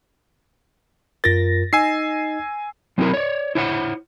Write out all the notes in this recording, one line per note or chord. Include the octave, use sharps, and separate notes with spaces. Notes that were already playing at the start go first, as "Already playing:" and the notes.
F#2 F4 A#4 A6 A#6
D#4 D#5 G#5 E6 C7
F#3 C4 D#4 E4 A#4
C#5 D5
E4 C5 C#5 F#5